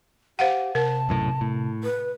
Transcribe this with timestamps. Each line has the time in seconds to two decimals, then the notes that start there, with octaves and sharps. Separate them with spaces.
0.39 G4 C5 F5 F#5
0.75 C3 A#4 A5
1.09 B1 F#2 A2
1.41 A2
1.84 B4